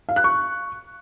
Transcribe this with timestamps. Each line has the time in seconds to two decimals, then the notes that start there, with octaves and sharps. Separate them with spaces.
0.09 F5
0.16 F#6
0.24 C#6